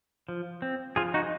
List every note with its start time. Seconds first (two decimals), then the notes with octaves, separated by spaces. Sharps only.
0.29 F3
0.62 C4
0.96 F3 F4 G#4
1.14 D#4 F#4